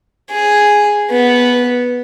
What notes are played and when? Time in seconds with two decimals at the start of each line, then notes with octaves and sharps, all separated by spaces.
0.30 G#4
1.10 B3